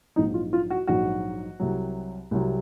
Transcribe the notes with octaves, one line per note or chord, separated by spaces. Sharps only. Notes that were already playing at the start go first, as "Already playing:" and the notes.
A#1 G#2 F#3 D#4
F4
F4
F#4
A#1 G#2 F#3 F#4
C2 C3 F#3
C2 C3 F#3